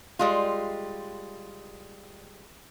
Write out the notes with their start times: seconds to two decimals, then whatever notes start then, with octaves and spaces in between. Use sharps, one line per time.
0.19 G3 G#3 F4